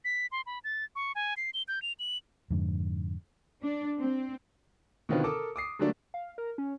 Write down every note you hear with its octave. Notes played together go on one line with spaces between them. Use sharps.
B6
C6
B5
A6
C#6
G#5
C7
G7
G6
F7
F#7
F2 G#2 D3
D4
C4
B2 D3 D#3 C4 F4 B4
A4 A#4 A5 D6 D#6
D6 D#6 C7
D3 F#3 G3 A3 A#3 D4
F5
A#4
C#4